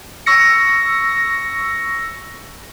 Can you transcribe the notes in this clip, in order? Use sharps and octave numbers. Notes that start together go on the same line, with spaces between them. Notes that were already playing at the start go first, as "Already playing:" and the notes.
C#6 E6 A#6 C#7